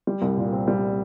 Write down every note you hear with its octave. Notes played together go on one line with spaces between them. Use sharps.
G3
C2
A#2
C4
G3